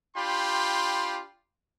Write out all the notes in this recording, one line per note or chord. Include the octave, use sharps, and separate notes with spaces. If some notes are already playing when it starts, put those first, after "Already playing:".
D4 F4 G4 G5 B5 C6